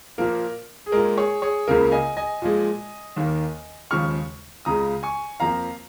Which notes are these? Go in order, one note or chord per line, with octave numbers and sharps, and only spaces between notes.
A#2 F3 A#3 A#4
G#4
A#2 G#3 A#4
G#4 C#5
G#4 C#5
C#2 C#3 A#3 A#4
D#5 G#5
D#5 G#5
A#2 F3 G#3
D#2 D#3 A#3
D#2 C#3 F3 G#3 C#6 F6
C#2 C#3 G#3 A#5 D#6
G#5 C#6
F2 F3 A#3 F5 A#5